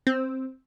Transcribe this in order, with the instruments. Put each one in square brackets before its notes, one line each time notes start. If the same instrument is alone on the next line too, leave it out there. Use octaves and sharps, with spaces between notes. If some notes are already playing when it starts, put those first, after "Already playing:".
[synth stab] C4